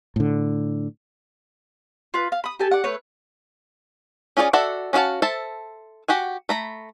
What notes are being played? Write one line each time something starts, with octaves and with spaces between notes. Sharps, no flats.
A2 D3
F4 B4
F5
B5 D#6
G4 A4 G#5 A5
D5 F#5
A3 B4 C#5
C#4 F4 G#4 C5 D5
F#4 A4 D5 E5 F#5
C#4 D4 F#4 F5 A5
A4 C5 E5 A5
F#4 G4 F#5 G#5
A3 A#5 B5